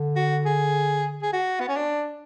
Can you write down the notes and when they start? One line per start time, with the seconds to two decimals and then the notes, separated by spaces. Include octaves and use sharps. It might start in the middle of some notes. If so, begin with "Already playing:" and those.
Already playing: D3
0.16 F#4
0.45 G#4
1.22 G#4
1.33 F#4
1.60 B3
1.68 C#4
1.76 D4